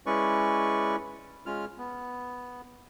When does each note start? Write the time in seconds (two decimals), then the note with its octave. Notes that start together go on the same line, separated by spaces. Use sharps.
0.06 G#3 C#4 E4 B4 D5 C#6
1.46 G#3 C#4 F4 F6
1.78 B3